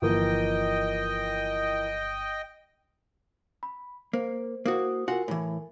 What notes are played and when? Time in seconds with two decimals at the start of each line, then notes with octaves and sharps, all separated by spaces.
0.02 G1 E3 F3 A#3 D#5 G5
3.63 B5
4.13 A#3 C5
4.66 A#3 E4 F#4 C5 D#6
5.08 F4 F#4 A#4 F#5 G#5
5.28 A2 E3